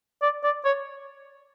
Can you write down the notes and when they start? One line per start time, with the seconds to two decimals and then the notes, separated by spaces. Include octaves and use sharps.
0.22 D5
0.44 D5
0.65 C#5